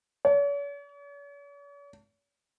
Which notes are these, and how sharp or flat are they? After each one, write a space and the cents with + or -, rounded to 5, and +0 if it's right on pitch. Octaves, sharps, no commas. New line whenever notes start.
C#5 +45